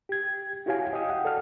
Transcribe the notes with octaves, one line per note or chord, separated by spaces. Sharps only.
G4 G#6
E4 F#4 G4 C#5 F5 G#5
D#5 F5 G5 D#6
F#5
A4 D5 F#5 F6